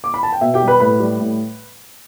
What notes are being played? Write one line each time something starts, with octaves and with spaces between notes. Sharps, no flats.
D6
B5
A5
G5
B2 E5
G4 G5
G3
B4 B5
A2 B4 B5
G3
A2